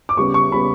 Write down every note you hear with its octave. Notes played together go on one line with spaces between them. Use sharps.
D6
C#3 G3 B3 C#6
C#6
C#3 G3 B3 B5